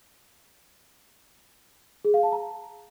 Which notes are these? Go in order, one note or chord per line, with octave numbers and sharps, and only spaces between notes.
G#4
F5
A5
A#5